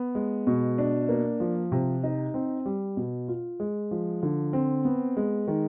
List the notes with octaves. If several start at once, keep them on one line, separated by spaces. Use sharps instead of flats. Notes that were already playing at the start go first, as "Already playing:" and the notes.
Already playing: B3
G#3
B2
D4
A#3
F3
C3
D#4
C4
G3
B2
F4
G#3
F3
D3
C4
B3
G#3
D#3